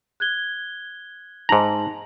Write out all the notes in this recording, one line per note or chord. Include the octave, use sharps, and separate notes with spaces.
F#6 G#6 G7
G#2 D#4 A5 A#5 F#7